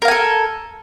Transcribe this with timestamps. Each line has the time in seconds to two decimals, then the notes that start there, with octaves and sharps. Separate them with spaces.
0.02 A#4
0.05 F5
0.08 G#5
0.11 A4